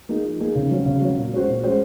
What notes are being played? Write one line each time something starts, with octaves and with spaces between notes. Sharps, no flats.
A#3 D#4 G#4
F3
A#3 D#4 G#4
C#3
F#3 C#4
C#3
F#3 C#4
A#2
G#3 C#4 F#4 C5
A#2
G#3 C#4 F#4 C5